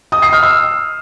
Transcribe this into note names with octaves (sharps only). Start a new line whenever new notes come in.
D#6
C7
F6
E6